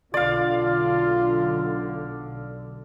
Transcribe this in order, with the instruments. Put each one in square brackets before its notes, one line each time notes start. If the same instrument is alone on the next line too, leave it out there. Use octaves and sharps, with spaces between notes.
[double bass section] B1 D3 [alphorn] F4 [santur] D5 F5